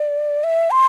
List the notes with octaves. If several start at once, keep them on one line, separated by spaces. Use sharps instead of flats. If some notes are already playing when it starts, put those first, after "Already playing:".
Already playing: D5
E5
C6